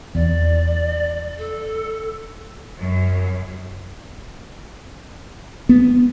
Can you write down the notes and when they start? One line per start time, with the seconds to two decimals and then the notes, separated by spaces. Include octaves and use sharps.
0.15 E2 D5
1.39 A4
2.78 F#2
5.69 B3